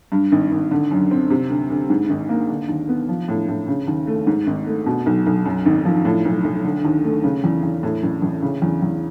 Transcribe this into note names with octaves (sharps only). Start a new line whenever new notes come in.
G2
G#1
G#1
D3
F#2
C4
C3
D2
D2
G#2
G#1
A#3
D3
D#2
B3
F3
A2
A2
C#3
D#2
A3
G#2
G#1
A3
B2
B1
B1
F#2
G#1
F3
A2
B1
B1
D3
D#2
A3
C#3
E2
E2
A2
A1
A1
C#3
E2
E2